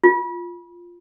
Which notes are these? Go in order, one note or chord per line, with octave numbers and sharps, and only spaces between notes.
F4